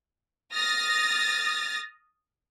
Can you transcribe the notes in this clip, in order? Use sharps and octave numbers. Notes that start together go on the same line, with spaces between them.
D#6 F6 A6 A#6